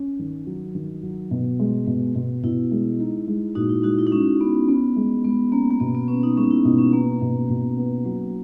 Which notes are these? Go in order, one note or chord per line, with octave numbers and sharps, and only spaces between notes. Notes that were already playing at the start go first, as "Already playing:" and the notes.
Already playing: C#4
D#3
F#3
D#3
F#3
B2
G#3
B2
B2
B2 E4
G#3
D#4
G#3
A#2 D#4 F#4
E4
G#3 D#4 F#4
E4
D#4
G#3 C#4
B3 C#4
B3 C#4
G#3
G#3 B3
A#3 C#4
A#3
B2 B3
B3
B3 C#4
D#4
G#3 C#4
D#4
E4
B2 D#4
C#4
A#3 B3
B2
B2
B3
F#3